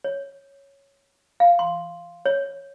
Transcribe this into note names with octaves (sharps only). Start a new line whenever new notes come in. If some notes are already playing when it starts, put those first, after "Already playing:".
C#5
F5
C6
C#5